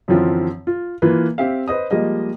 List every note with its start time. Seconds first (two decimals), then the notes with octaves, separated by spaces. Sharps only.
0.08 F#2 D3 E3 F3 C4 F4
0.67 F4
1.02 E3 A#3 F4 B4
1.38 C4 G4 E5 F5
1.68 B4 C5 D#5 D#6
1.91 F3 G3 G#3 A#3 D#5